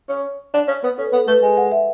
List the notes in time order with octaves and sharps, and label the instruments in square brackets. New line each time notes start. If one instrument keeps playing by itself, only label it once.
[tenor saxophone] C#4
D4
C#4
B3
[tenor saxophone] C#4 [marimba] A4
[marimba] B4
[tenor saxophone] B3 [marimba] A4
[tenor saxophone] A3 [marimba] B4
[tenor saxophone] G#3 [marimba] G#5
[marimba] F#5
E5